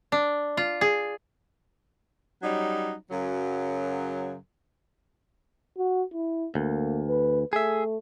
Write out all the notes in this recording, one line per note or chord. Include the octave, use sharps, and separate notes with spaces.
D4
F4
G#4
F#3 G3 C#4 D#4
F#2 C#3 F#3
F#4
E4
D2 A#3
B4
A3 G#4 E5